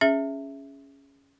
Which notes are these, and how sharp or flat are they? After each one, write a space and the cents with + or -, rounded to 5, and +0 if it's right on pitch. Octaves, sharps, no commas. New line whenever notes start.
C#4 +0 G#4 +0 E5 +0